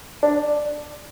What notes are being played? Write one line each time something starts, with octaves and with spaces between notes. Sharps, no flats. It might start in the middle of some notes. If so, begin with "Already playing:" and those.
D4